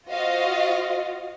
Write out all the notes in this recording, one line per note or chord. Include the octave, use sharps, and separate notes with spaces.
F4 F#4 C5 D#5 F5